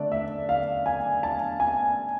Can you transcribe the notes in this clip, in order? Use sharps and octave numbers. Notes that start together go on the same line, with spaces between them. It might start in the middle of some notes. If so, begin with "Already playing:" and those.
Already playing: D3 A3 D4 D5
E5
F5
G#5
A5
G#5